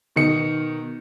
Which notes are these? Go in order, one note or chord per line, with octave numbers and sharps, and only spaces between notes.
B2 D#3 D#4 C#7